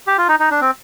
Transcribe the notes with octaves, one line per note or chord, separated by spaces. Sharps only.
G4
F4
D#4
D#4
D4
C4